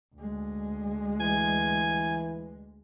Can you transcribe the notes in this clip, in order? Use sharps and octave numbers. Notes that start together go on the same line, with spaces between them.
D2 G#3
E3 G#5